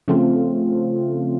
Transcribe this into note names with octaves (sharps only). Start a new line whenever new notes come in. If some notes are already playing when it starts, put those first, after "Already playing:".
C#3 F3 A3 C4 F4